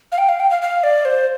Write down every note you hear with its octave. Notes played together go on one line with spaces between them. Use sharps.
F5
G5
F5
G5
F5
F5
D5
C5